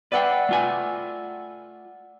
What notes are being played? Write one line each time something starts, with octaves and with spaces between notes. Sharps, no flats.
B4 D5 E5 F#5 G5
A3 F4 G#5